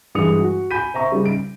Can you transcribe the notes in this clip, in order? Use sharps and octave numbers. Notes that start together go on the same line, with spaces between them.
G2 E3 G#3 D#6 C#7 F7
F#4
G#5 B5 G6 B6 D#7
C5 E5 A#5 C#6
C#3 G3 D#4
D7